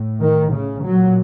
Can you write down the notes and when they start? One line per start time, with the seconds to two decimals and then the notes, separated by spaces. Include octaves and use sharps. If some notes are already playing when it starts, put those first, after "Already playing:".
Already playing: A2
0.21 D#3
0.52 C#3
0.84 A#2 F#3